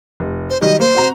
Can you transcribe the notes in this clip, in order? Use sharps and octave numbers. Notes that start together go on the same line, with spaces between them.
F1
C5
D#3 F#3 G3 D#5
A#3 C5
C4 F#4 A#5